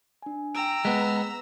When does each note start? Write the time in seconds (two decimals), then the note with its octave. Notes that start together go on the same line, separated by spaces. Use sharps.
0.22 D4 G#5
0.55 G5 A#5 E6 D7
0.85 G#3 B3 B6